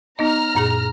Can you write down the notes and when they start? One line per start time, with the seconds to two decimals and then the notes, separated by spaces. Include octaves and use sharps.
0.19 B3 D#4 D#5 A#5 F6
0.55 F#2 A#2 G#4